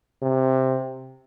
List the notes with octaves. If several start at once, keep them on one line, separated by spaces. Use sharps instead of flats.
C3